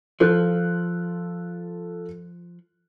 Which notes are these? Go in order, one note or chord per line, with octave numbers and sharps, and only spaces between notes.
F3 F4 A4 F#6